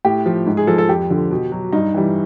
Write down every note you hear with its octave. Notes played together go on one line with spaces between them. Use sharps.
A2 G4
F3
G#2
G#4
F3 A4
A4
F2 G4
D3 F3
B2
F#3
G2 D#4
E3 G3